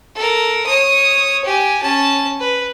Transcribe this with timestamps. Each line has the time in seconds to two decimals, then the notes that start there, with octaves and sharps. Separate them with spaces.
0.15 A4 A#4
0.66 C#5 D#6
1.45 G4 G#5
1.82 C#4 A5
2.40 B4